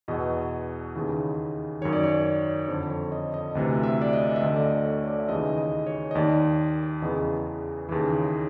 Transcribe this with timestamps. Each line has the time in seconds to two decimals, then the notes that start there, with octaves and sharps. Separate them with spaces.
0.08 E2 B2 D#5
0.95 D#2 C#3 E3
1.81 F#2 D#3 C#5
1.93 D5
2.03 C#5
2.14 D5
2.26 C#5
2.68 F2 D3 C5
2.90 C#5
3.12 D#5
3.34 D#5
3.55 D2 C3 E3
3.83 E5
4.02 D5
4.13 D#5
4.36 E5
4.41 D2 D3 D#5
4.56 D5
4.64 D#5
4.85 C#5
5.08 D5
5.20 E5
5.29 D#2 C#3 E3 D#5
5.58 D#5
5.87 C#5
6.11 D#5
6.15 D#2 D#3 D5
7.02 E2 C#3 E3 D#5
7.89 D#2 C#3 E3